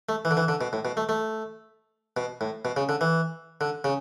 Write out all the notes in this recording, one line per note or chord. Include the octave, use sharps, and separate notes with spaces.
A3
E3
D3
E3
D3
B2
A2
B2
A3
A3
B2
A2
B2
C#3
D3
E3
D3
C#3